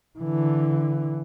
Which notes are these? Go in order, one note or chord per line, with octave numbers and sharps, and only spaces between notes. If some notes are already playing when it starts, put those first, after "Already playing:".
D3 E3